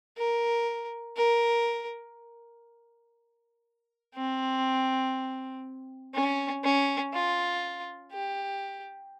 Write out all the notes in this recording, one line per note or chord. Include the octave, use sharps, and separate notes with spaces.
A#4
A#4
C4
C#4
C#4
F4
G4